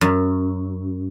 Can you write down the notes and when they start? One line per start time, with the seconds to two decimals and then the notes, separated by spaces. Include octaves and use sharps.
0.01 F#2